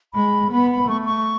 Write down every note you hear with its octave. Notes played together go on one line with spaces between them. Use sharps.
G#3 B5
B3 B5
B5
A3 C#6
C#6